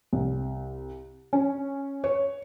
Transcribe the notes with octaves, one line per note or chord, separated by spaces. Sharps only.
C2
C#4
C#5